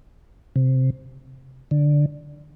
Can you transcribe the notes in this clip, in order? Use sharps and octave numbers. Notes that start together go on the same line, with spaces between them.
C3
D3